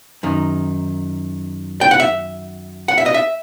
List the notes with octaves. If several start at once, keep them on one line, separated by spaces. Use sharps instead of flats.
F#2 D#3
G5
F#5
E5
F#5
E5
D#5
E5